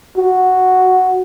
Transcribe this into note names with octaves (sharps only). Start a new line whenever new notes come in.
F#4